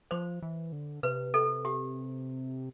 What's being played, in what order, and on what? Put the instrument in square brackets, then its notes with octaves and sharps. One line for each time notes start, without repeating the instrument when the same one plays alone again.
[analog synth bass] F3 [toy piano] C5
[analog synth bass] E3
D3
[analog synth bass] C3 [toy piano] B4
[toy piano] A4
G4